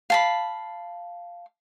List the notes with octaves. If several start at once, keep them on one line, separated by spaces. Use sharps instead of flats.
F5 A5 B5